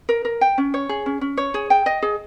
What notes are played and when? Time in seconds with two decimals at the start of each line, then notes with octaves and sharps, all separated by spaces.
0.09 A#4
0.25 A#4
0.41 G5
0.58 C#4
0.74 C#5
0.89 G#4
1.06 C#4
1.21 C#4
1.37 C#5
1.54 G#4
1.70 G5
1.86 D#5
2.02 G#4